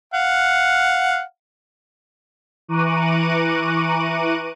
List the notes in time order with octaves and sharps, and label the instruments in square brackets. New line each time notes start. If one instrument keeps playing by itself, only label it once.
[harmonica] F5 F#5
[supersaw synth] E3 A#5 C#6 D6 F#6 D#7